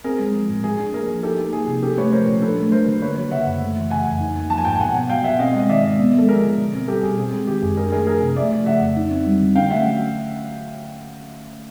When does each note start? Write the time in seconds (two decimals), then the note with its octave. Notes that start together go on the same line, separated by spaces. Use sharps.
0.04 C4 G#4 A#4
0.19 G#3
0.35 F3
0.49 A2
0.64 F3 G#4
0.79 D4
0.94 A#3 G#4 A#4
1.09 F3
1.23 D#4 G4 A4
1.39 A#3
1.53 F3 G#4
1.68 C3
1.83 C#4 G4 A4
1.98 A3 B4 C#5
2.12 F3 A#4 C5
2.27 A#2
2.42 D4 A4 B4
2.57 A3
2.72 F#3 A#4 C5
2.87 D3
3.02 A#3 B4 C#5
3.17 F#3
3.31 C#3 E5 F#5
3.46 F#2
3.61 A3
3.76 E3
3.90 C#3 F#5 G#5
4.06 F2
4.20 D#4
4.36 A#3
4.50 F3 A5
4.58 G#5
4.65 G#2 G5 A5
4.80 B2 F#5 G#5
4.95 B3
5.09 F#3 F5 G5
5.24 B2 E5 F#5
5.39 C4 D#5 F5
5.55 G#3 D#5
5.69 D#3 D5 E5
5.84 G#2
5.99 B3
6.14 G#3 A4
6.29 F3 G#4 A#4
6.43 D3
6.58 B2
6.73 C4
6.88 G3 G4 A4
7.03 B2 G#4
7.18 C4 G#4
7.33 G#3
7.47 D#3 G4
7.62 F#2 G#4
7.77 D4 G#4 A#4
7.92 A3 G#4 A#4
8.07 F3 G#4 A#4
8.22 C3
8.36 A3 D5 E5
8.52 F3
8.66 C#3 E5 F#5
8.81 F2
8.96 D#4
9.11 C4
9.26 G3
9.41 D3
9.55 C#4 F5 G5
9.70 A3 E5 F#5
9.86 F#3